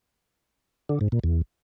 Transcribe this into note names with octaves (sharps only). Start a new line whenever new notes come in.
D3
G#2
A#2
E2